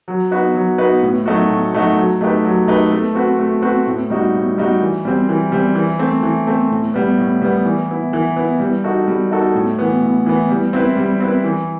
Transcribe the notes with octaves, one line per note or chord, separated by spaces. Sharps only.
F#3
B3 D#4 F#4 B4
F#3
B3 D#4 F#4 B4
A2
F#3 A3 D#4 F#4
A2
F#3 A3 D#4 F#4
F#3
A3 D#4 G4 B4
F#3
A3 D#4 G4 B4
A3
C4 F#4 B4
A3
C4 F#4 B4
A2
G3 D#4 F#4
A2
G3 D#4 F#4
E3
G3 C4
E3
G3 C4
E3
A3 C4
E3
A3 C4
A2
G3 B3
A2
G3 B3
E3
B3 E4
E3
B3 E4
G3
D#4 F#4 A4
G3
D#4 F#4 A4
A2
E3 B3
A2
E3 B3
G3
C4 E4 B4
G3
C4 E4 B4
E3